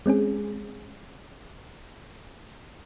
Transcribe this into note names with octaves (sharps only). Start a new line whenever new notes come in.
G#3 C4 C#4 G#4